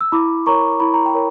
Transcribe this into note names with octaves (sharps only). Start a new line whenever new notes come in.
E6
E4 B5 D6
A#4 C#5 A#5 C#6
E4 B5
A#5
G5
A#4 C#5